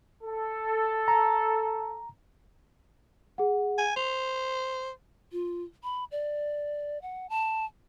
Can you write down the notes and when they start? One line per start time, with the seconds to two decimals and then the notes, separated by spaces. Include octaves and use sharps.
0.23 A4
1.08 A#5
3.38 G#4 F#5
3.78 G#5
3.96 C5 F7
5.32 F4
5.83 B5
6.11 D5
7.02 F#5
7.30 A5